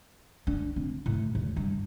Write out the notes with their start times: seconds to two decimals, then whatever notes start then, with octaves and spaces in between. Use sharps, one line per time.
0.47 D4
0.76 C4
1.06 A2
1.35 E2
1.57 G2